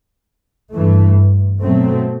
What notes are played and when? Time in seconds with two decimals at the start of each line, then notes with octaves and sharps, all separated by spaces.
0.73 G2 E3 A3
1.61 B2 F#3 A3 C4